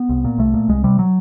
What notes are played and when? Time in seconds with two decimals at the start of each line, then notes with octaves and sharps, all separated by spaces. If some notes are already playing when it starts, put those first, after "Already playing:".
Already playing: B3
0.09 C2
0.25 A#2
0.38 C2 A3
0.54 A#2
0.69 C2 G#3
0.84 C3 G3
0.99 F#3